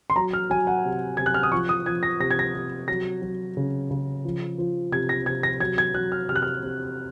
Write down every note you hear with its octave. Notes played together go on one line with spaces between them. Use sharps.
C6
F#3 A#5
F6
F#3 G#5
F#5
C3
C3 G#6
F#6
F6
D#6
F3 C#6
D#6
F3 G#6
A#6
C3 A#6
G#6
A#6
C3
F#3 A#6
F#3
C#3
C#3
F3
F3
C3 G#6
A#6
C3 G#6
A#6
F#3 G#6
G#6
F#3 F#6
F6
C3 F6
F#6
F6
C3